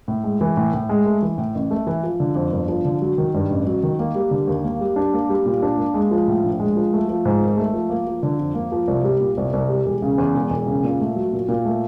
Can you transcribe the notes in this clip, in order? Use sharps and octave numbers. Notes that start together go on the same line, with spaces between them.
A2
G#3
E3
A2
A2
G#3
A3
E3
A2
A1
A3
E3
F3
D3
F2
G1
F3
D3
F#3
D#3
G2
A1
F#3
D#3
A#3
G3
D3
D#2
A#3
G3
D4
A#3
G3
A#2
D4
A#3
G#3
F3
A2
A#1
G#3
F3
A3
F3
G#2
G#1
A3
F3
A#3
F3
D3
F2
A#3
F3
C2
G3
A#2
C2
C2
G3
E1
C#3
E2
E1
E1
C#3
A#2
A3
F#3
A#2
A#2
A3